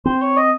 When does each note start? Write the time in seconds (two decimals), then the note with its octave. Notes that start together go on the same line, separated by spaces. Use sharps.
0.05 C4 C5
0.22 C#5
0.37 D#5